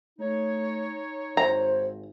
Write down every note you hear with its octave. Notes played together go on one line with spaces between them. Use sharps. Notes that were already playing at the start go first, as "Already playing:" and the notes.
A3 D#4 C#5
G#1 C5 A#5